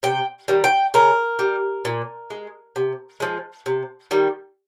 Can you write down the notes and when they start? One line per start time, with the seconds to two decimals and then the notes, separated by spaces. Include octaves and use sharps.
0.03 C3 G5
0.48 D#3 G3
0.64 G5
0.94 C#3 A#4
1.39 G3
1.85 A#2
2.30 G#3
2.76 C3
3.20 F3 G#3
3.66 C3
4.11 D#3 G3